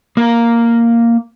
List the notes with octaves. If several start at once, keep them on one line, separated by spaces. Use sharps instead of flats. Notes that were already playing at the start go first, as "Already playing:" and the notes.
A#3 A#4